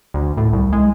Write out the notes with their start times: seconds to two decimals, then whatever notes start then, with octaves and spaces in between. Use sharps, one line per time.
0.14 D2
0.37 A2
0.53 C2
0.73 G#3